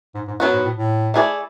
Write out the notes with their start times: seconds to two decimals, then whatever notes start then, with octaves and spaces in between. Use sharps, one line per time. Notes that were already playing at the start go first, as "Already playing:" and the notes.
0.15 G#2
0.28 G#2
0.40 F#2 F#3 B3 F#4
0.53 G#2
0.64 A2
0.77 A2
1.14 A3 E4 G#4 B4 D5